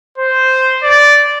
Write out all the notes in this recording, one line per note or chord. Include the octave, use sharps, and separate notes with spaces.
C5
D5